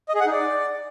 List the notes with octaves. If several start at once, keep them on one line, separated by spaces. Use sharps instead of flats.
D#5
G#4
F#5
D#4
D5